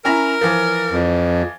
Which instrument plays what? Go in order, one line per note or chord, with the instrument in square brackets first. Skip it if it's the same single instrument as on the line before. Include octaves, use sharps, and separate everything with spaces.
[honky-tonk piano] C#4 E4 A#5 [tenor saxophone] A#4
[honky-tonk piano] E3 F3
[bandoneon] F2